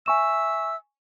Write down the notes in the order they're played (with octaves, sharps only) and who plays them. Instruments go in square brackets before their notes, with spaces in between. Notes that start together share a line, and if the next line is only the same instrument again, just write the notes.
[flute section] E5 E6 [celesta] G#5 C#6 E7